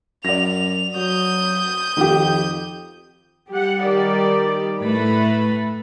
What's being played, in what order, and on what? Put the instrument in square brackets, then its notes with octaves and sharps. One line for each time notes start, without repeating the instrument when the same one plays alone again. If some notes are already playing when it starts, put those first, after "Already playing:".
[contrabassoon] F#2 [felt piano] D5 A#6 [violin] F7
[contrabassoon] F#3 [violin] D#6 G6
[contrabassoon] F2 [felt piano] D#3 G4
[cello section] G3 [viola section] G4 F#5
[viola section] D#3 G4 D5
[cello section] A2 A3 [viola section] B4 B5